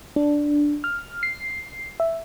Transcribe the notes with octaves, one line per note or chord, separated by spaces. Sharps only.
D4
F6
C7
E5